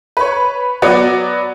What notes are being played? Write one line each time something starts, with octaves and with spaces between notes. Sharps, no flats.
B4 C#5
F#3 B3 F#4 D5